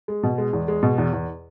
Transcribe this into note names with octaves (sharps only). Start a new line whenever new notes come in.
G#3
B2
G#3
E2
G#3
B2
E2
E2